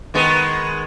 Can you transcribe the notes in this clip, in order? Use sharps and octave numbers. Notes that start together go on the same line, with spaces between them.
D#3 G#3 B3